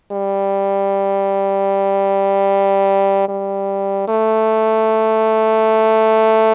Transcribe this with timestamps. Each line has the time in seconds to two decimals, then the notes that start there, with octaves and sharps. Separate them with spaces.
0.12 G3
3.29 G3
4.08 A3